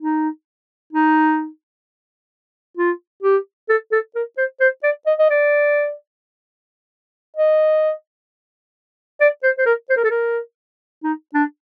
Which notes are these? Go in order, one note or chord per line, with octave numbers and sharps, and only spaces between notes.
D#4
D#4
F4
G4
A4
A4
A#4
C5
C5
D5
D#5
D#5
D5
D#5
D5
C5
C5
A#4
C5
A#4
A4
A#4
D#4
D4